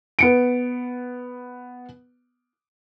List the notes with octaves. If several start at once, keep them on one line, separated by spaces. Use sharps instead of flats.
B3 C#7 D7